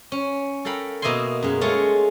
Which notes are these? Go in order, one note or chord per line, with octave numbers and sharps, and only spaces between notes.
C#4
A4 A#4 F5 G5 B5
B2 A#3 D#5 E5 G#5 C6
F#2 G#3
G#3 A3 F4 C#5